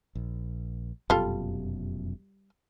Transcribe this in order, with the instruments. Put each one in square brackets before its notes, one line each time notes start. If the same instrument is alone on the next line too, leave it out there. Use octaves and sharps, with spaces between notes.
[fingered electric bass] A#1
[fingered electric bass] F1 F#2 B2 [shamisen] G3 F4 A4